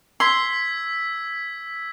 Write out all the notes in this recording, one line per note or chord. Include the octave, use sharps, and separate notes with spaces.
C6 E6 G#6 B6